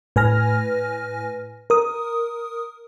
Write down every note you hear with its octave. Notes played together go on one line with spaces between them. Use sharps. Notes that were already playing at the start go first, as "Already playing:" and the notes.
A2 B4 G#5 F6 A#6
A#4 D#6